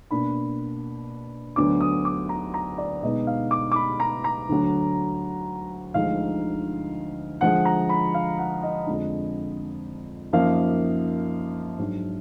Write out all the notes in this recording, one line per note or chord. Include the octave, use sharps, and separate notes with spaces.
B2 A#3 D4 B5
D2 D3 F#3 B3 D4 D6
D#6
D6
A#5
A#5
D5
B2 G#3 B3 D#4 D#5
F5
D6
D6
B5
A#5
A#5
D2 D3 F#3
D2 D3 F3 G#3 D#4 F5
D3 F3 G#3 F#5
A#5
B5
F5
F#5
D#5
F2 D3 G#3 D4
F#2 F3 A#3 D#4 F5
G#2 F#3 D4